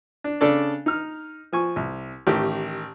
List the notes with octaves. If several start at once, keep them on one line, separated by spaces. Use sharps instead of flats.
D4
C#3 D4 A4 D5
D#4 F6
F3 G#5 C#6
C2
A1 D#3 G4